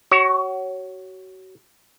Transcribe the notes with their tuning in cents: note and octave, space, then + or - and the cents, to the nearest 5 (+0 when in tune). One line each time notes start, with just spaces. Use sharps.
F#4 +30 C#5 +0